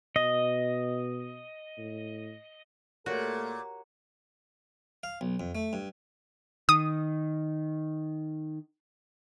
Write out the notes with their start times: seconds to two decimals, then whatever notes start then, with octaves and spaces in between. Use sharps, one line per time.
0.16 B2 D#5
1.78 A2
3.06 A#2 A3 A#3 F#4 G4 A4 A#4 C#5
5.03 F5
5.21 B1
5.40 F2
5.55 A3
5.73 G2
6.69 D#3 D#6